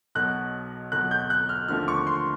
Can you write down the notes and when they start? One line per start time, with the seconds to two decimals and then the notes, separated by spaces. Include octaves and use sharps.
0.15 B1 B2 F#3 F#6
0.92 B1 B2 F#3 F#6
1.11 G6
1.30 F#6
1.49 F6
1.68 D#2 D3 F3 A3 F6
1.88 C#6
2.07 C6